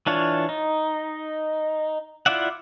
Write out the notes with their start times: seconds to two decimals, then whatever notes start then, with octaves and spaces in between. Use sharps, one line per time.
0.07 E3 D4 F4 C#5
0.49 D#4
2.26 E4 F4 D5 E5 F#5